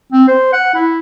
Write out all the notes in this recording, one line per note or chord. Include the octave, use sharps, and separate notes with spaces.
C4
C5
F#5
E4